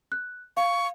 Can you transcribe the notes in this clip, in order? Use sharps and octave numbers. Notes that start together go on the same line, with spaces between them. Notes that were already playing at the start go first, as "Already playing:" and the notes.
F#6
F5 C#6